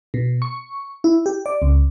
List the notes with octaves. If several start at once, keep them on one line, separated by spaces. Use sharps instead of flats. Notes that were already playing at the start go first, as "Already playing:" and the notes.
B2
C#6
E4
G4
D5
C#2